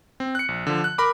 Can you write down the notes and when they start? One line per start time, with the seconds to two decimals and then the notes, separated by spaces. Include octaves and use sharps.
0.20 C4
0.35 F#6 C#7
0.48 A#1
0.67 D3 F3
0.84 F#6
0.98 A#4 B5 D6